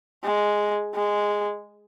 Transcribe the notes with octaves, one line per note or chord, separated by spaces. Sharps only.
G#3
G#3